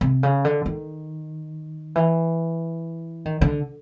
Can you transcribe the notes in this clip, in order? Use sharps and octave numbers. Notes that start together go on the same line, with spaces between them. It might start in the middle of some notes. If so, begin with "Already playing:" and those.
C3
C#3
D3
D#3
E3
D#3
D3